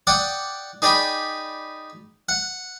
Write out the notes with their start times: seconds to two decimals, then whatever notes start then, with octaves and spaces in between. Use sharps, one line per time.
0.07 D5 F#5 G5 D#6
0.82 D#4 G#4 D5 G5 B5
2.29 F#5